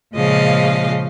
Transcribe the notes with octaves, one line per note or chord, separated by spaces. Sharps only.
A#2 C#3 F3 G#3 D#5 F5